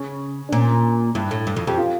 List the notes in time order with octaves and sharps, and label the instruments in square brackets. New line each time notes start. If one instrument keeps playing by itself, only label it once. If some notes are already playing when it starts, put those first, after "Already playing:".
Already playing: [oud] C#3 [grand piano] C#4
[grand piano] D4
[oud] A#2 [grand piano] C#4
[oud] G2 [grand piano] E4
[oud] A2
G2
F2
[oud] F2 [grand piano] G4
[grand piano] F4